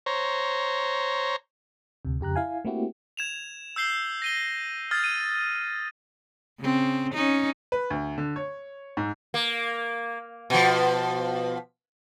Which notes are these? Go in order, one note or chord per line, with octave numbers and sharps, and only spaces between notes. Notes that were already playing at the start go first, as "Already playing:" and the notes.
C5 C#5 A#5
D2 C3
F2 C#3 G4 A#5 F#6
E4 F5 G#5
A3 A#3 C4 E4 F#4 G4
G#6 E7 F7
E6 G6 C7 G7
A#6 D#7 G7
D#6 F6 G#6 A6
D#7
C#3 C4
C#4 D#4
B4
D2
D3
C#5
G#2
A#3
B2 F3